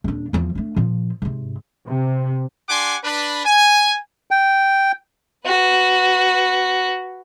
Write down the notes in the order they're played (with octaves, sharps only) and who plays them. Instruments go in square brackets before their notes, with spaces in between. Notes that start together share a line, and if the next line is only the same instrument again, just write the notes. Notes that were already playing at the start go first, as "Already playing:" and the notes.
[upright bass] D#1 D4
E2 F3
A3 D4
A#2 F3
G#2 C3
[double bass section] C3
[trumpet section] D4 G4 F#5 G#5 C6 D6
D4 B4
G#5
[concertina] G5
[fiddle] F#4 B4